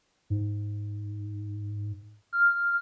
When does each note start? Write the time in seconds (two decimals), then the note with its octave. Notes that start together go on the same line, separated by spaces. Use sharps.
0.30 G#2
2.33 F6